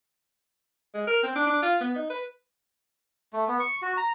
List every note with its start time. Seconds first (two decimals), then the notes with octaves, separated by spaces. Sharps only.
0.94 G#3
1.07 A#4
1.23 C4
1.35 D4
1.47 D4
1.62 F4
1.81 B3
1.96 D#4
2.10 B4
3.33 A3
3.48 B3
3.60 C#6
3.82 F#4
3.97 A#5